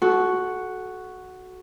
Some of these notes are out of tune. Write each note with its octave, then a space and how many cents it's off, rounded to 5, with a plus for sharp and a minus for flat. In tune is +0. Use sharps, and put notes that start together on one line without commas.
F#4 +0 A4 -30